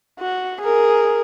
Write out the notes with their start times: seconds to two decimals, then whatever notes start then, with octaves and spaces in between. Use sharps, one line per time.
0.20 F#4
0.61 G#4 A#4